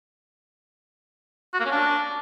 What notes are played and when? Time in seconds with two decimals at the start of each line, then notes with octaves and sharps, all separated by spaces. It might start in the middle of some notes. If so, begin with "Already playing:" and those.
1.54 F#4
1.60 A#3
1.66 C#4
1.71 D4